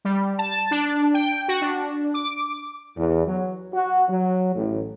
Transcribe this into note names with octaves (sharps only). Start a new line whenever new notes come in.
G3
A5
D4
G5
F#4
D4
D6
E2
F#3
F#4
F#3
A1